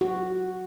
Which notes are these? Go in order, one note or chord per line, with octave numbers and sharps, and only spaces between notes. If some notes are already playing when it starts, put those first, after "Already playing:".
F#4